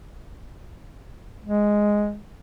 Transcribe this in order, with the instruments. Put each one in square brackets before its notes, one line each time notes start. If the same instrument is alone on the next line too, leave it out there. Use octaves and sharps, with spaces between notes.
[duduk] G#3